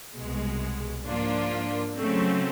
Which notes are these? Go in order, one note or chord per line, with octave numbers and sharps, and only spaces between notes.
C2 B2 G#3
G#2 F3 A#3 D4 F4
C#3 F#3 A3 C4